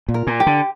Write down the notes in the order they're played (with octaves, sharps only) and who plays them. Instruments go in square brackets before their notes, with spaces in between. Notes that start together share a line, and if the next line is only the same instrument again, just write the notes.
[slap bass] A#2
[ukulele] A#4
[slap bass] A#2
[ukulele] G4
[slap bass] D3